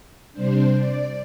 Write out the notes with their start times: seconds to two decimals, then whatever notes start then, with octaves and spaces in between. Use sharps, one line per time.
0.33 C3 G3 D4 C5
0.73 D5